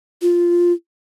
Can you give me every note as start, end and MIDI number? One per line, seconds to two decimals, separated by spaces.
0.22 0.72 65